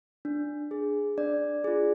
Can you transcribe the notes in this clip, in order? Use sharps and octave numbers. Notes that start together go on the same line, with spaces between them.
D4
G#4
D4 D5
F4 G#4